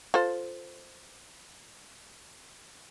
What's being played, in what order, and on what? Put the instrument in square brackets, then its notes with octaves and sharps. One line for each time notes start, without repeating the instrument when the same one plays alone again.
[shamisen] F4 A4 C5